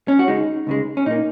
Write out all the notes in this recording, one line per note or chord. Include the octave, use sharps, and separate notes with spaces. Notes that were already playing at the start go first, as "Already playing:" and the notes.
C#4
F#4
C#2 C#3 G#3 D#4
C#2 C#3 G#3
C#4
A#2 A#3 D#4